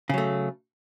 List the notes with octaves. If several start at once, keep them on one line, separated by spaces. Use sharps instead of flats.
C#3 F#3 A3